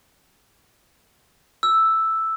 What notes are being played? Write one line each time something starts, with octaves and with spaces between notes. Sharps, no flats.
E6